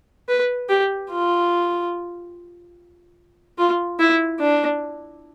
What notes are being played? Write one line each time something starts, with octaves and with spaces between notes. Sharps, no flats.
B4
G4
F4
F4
E4
D4